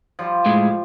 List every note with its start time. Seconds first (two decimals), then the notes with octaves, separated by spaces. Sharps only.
0.19 F3 G3
0.46 A2 G#3